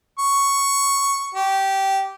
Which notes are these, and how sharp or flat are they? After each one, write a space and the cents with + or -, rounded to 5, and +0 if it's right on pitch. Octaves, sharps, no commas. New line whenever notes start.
C#6 +0
G4 -15